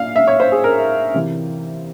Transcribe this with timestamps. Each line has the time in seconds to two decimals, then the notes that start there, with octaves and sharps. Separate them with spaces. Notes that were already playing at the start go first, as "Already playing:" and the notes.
Already playing: A#2 F5
0.16 E5
0.28 C#5
0.40 C5
0.52 G#4
0.64 A#4
1.14 C3 E3